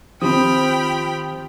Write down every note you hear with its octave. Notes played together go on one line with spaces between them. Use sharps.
D#3 F3 C4 G4 G5 B5 D#6 F6